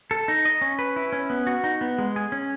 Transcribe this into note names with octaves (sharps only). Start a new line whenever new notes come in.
A4
D#4
D#5
C#4
B4
E4
C#4
B3
F#4
D#4
B3
G#3
G#4
C#4